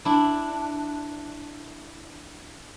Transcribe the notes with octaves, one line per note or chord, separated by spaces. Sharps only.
D4 E4